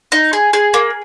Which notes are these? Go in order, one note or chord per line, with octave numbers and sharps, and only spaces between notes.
D#4
G#4
G#4
A#3